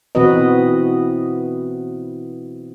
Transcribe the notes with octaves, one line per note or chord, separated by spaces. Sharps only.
B2 E3 C4 F#4 B4 D#5